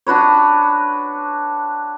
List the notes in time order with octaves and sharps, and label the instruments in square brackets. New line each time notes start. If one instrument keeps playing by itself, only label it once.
[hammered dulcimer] D4 F#4 B4 C#5